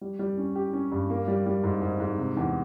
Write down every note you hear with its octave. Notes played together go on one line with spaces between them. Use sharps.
G3
G3
C#4
G4
C#4
G2
A#3
G3
G3
G#2
G#2
G#2
C3
E2